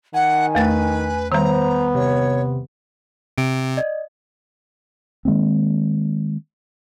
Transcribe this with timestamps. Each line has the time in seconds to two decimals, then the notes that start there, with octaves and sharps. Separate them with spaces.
0.14 D#3 F#5 G#5
0.55 E2 A3 B4 A6
1.32 D#3 G3 B3 C5 A#5
1.95 C3 C#5
3.38 C3 D7
3.77 D5 D#5
5.25 D#3 G#3 A#3 C4